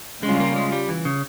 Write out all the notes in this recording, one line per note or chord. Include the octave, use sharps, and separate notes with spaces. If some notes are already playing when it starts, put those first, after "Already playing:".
C#3 G3 G#3 C#4 F4
A#3
G#3
G3
E3
C#3